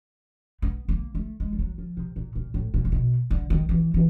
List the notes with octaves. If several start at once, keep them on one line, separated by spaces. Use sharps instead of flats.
B3
A#3
A3
G#3
F3
F#3
F3
C3
A#2
A#2
A2
A#2
C3
B2
D3
D#3
E3
E3